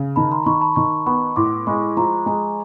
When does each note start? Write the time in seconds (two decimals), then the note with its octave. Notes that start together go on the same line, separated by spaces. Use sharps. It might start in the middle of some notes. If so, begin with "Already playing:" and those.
Already playing: C#3
0.16 D#3 A5 B5
0.32 A#5 C6
0.46 D#3 B5 C#6
0.61 A5 B5
0.76 D#3 B5 C#6
1.06 B3 B5 C#6
1.36 A2 C6 D6
1.67 G#3 B5 C#6
1.97 F3 A#5 C6
2.26 G#3 G#5 A#5